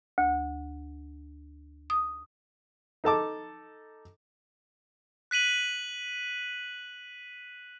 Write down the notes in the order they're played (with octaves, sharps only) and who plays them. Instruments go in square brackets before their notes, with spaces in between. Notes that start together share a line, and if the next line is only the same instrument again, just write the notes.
[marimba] D2
D#6
[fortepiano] D#4 A4 A5 D6
[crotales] F#6 B6 D#7 F#7